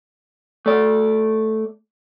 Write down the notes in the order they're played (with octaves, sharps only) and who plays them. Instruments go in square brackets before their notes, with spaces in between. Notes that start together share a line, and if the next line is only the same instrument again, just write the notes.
[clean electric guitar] A3 D5